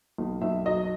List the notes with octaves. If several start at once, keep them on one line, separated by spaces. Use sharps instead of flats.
B1
B1 E5
F#3 D#5